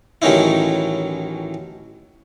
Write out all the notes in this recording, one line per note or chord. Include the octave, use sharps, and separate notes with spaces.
A1 D#3 F#3 C#4 D#4 E4